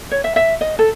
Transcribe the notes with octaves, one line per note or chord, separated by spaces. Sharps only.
C#5
E5
E5
D#5
A4